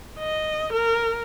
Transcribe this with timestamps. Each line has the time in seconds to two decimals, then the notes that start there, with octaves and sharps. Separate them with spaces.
0.19 D#5
0.73 A#4